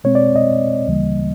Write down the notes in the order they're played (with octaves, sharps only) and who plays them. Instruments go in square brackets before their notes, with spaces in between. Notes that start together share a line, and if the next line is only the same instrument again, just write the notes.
[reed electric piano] B2 G#3 C4 C#5
D5
D#5
D2 C#3 E3 G3 A#3